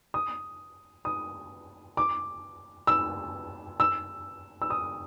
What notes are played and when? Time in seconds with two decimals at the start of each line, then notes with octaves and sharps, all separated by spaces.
0.14 D#6
1.05 D#6
1.97 D6
2.87 E6
3.80 E6
4.62 E6
4.70 D#6